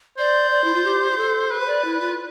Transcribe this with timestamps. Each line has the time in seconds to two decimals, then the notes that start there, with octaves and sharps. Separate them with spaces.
0.18 C5 D5
0.51 D5
0.64 E4
0.74 F4
0.84 G4
1.11 G4
1.18 A4
1.51 A4 B4
1.60 C5
1.68 D5
1.84 E4
2.00 F4